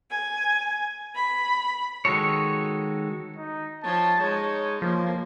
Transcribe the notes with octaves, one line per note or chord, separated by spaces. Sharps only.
G#5
B5
D#3 G#3 F#4 A4 C#5
D#4
F3 C#5 A5
G#3 D#4 C#5
F3 A#3